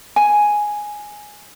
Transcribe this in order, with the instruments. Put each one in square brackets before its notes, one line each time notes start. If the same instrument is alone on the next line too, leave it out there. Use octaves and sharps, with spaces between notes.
[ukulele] G#5